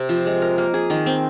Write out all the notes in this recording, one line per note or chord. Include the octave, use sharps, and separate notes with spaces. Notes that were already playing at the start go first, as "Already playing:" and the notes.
Already playing: C3 C4
F3
G#3
A#4
A#3
G#4
D#3
C4